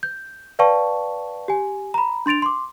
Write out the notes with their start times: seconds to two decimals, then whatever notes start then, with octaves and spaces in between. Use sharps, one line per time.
0.03 G6
0.59 B4 D5 F5 G5 A5 C#6
1.48 G4 G#5
1.94 A#5 B5
2.26 D4 C6 A6 D7 F7
2.42 C6 D6